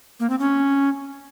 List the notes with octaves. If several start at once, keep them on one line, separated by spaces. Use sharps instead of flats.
A#3
C4
C#4